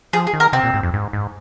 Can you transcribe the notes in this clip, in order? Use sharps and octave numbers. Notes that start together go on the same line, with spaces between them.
F3 G#4
G#4
D#3
A#4
C3 C4
A#2
G#2
F2
G#2
G#2